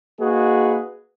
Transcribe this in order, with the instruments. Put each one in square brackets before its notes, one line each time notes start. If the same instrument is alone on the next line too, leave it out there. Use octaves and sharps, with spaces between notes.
[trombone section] A#3 D#4 F#4 G#4 B4